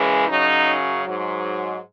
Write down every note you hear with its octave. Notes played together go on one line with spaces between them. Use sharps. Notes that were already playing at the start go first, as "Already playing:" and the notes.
Already playing: F#2 C#3 E3 G#3
F#2 C#3 F#3 D#4
G#2 F#3